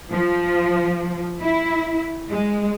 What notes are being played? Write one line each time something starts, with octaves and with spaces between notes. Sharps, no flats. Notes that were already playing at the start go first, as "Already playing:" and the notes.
F3
E4
G#3